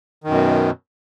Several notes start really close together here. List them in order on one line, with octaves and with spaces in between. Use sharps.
D#3 F#2 B2